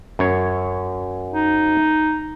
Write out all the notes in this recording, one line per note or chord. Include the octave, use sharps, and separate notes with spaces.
F#2 C#5
D#4